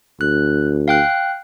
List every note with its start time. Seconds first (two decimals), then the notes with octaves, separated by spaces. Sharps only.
0.21 D2 F#6
0.88 F5 G5 F#6